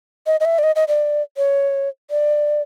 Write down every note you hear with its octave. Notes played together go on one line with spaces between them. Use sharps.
D#5
D#5
E5
D5
D#5
D#5
D5
C#5
D5